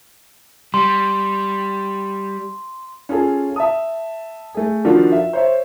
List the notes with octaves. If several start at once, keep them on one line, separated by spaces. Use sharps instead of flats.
G3 C6
C#4 F4 G#4 A4
E5 A5 D#6
A3 G#4
D#3 F3 D4 F4 F#4 A4
E5
C5 C#5 E5